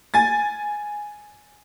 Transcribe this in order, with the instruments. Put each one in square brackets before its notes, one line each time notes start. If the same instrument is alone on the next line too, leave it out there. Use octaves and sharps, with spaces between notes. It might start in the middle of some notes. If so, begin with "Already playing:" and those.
[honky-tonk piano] G#5 A6